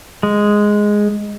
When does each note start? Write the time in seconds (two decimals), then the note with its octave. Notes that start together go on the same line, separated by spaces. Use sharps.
0.23 G#3